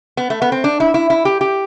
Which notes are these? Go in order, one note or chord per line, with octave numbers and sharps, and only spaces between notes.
B3
A3
B3
C4
D4
E4
E4
E4
G4
G4